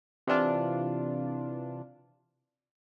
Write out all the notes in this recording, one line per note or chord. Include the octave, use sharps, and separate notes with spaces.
C3 E3 D4 F4